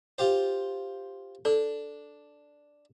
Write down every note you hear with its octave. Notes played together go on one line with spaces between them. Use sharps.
F4 G4 C5
D4 A4